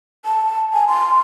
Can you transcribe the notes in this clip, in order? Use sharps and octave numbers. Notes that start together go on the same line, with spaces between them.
A5
G#5
C6